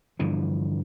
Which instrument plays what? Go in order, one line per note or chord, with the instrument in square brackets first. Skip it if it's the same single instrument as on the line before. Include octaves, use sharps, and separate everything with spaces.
[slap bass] G2 D3 E3 F3